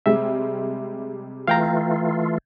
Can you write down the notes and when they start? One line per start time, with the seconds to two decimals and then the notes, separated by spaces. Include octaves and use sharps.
0.06 C3 G3 G#3 E5
1.48 E3 A3 F4 F5 G5 A#5